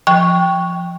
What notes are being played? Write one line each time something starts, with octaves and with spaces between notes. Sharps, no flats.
F3 G5 C#6